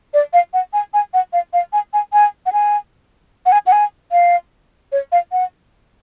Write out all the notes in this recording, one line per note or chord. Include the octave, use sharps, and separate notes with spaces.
D5
F5
F#5
G#5
G#5
F#5
F5
F5
G#5
G#5
G#5
F#5
G#5
F#5
G#5
F#5
G#5
F5
C#5
F5
F#5